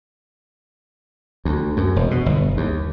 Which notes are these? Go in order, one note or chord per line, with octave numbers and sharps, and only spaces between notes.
D2
F#2
E1
B2
G1
D#2